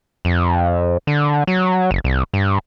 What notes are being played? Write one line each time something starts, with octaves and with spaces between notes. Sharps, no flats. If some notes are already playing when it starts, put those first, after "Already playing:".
F2
D3
F#3
F#1
C2
G2